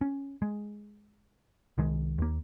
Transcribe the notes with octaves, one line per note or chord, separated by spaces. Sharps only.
C#4
G#3
C2 D#3 G#3
D#2 A#3